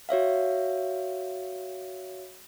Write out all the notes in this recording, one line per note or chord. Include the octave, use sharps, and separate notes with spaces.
F#4 C#5 E5 F5